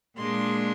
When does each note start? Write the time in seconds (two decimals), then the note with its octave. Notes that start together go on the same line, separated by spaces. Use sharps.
0.17 A#2 G#3 D4 C6